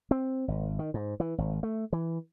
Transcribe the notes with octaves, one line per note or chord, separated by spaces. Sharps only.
C4
G#1
D#3
G#2
E3
G#1
A3
E3